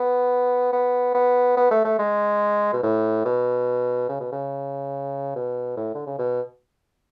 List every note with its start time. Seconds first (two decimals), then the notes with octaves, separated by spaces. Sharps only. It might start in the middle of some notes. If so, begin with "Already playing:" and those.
Already playing: B3
0.73 B3
1.14 B3
1.57 B3
1.71 A3
1.85 A3
1.99 G#3
2.73 B2
2.83 A2
3.25 B2
4.09 C#3
4.20 B2
4.32 C#3
5.35 B2
5.77 A2
5.95 D3
6.07 C#3
6.19 B2